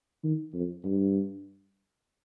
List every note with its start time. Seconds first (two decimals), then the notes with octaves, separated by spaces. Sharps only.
0.23 D#3
0.53 F2
0.84 G2